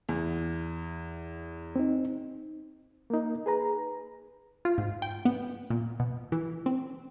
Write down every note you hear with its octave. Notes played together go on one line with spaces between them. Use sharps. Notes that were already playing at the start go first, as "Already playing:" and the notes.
E2
C4 D#4
A#3 D#4
G#4 B4 A#5
F4
G#2
G5
B3
A#2
B2
E3
C4